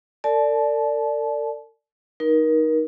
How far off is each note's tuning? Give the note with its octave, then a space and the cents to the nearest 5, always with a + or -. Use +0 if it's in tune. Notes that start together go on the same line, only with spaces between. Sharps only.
A4 +45 D5 -5 A5 -30
D#4 +0 A#4 +30